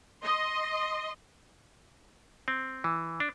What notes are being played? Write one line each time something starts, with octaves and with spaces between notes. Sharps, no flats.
D#5 C6
C4
E3
D4